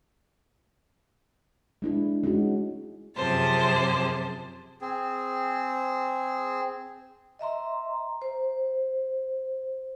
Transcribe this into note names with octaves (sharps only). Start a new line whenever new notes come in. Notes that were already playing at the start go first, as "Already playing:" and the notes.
G#3 D4 E4
G#3 C#4 D#4 F#4
F#2 C3 F3 G#4 C5 A5
C4 G#4
D#5 E5 A#5 C6
C5